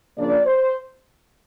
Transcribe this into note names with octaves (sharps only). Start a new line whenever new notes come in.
C#3 F3 A#3 D4 D5
C5